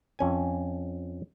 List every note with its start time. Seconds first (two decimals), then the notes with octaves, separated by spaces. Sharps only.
0.19 F2 C#4 G#5